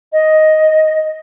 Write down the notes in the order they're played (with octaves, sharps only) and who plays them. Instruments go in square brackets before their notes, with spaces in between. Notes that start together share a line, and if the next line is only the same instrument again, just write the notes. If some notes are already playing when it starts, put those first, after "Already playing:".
[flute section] D#5